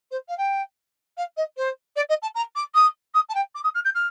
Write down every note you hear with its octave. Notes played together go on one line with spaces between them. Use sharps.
C5
F5
G5
F5
D#5
C5
D5
D#5
A5
A#5
D6
D#6
D#6
A5
G5
D6
D#6
F6
G6
F6